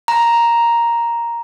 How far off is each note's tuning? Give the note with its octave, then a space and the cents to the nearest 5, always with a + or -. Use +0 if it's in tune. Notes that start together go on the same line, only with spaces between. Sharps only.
A#5 +5